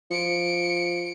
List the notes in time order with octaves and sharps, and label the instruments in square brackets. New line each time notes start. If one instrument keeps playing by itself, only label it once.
[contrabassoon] F3 [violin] C#7 D7